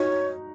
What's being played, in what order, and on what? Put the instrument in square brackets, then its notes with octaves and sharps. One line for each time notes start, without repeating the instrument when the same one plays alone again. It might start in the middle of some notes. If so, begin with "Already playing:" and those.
Already playing: [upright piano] D#4 F#4 [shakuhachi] C#5